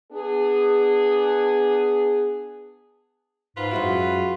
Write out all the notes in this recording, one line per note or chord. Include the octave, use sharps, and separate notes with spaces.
B3 D4 G#4
G#2 F4 B4
F#2 G#3 E4 F#4